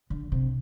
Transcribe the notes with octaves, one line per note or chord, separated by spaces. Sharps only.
D3
C3